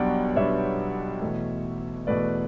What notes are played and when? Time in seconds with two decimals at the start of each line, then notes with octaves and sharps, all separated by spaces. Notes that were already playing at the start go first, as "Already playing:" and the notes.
Already playing: B1 B2 G3 B3 D4 D5 F#5 G5
0.36 B1 B2 G3 B3 D4 C#5 E5
1.22 E2 B2 A3
2.07 E2 B2 A3 B4 D5